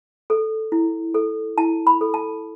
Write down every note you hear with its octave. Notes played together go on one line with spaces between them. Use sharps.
A4
E4
A4
E4 A5
B5
A4
A5